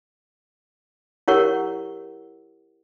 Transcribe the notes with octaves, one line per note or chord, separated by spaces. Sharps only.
E4 G4 A#4 C#5 F#5 C#6